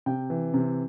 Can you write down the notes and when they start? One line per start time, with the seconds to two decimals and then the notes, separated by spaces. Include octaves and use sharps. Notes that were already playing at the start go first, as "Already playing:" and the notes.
0.06 C3 G5
0.30 E3
0.54 C3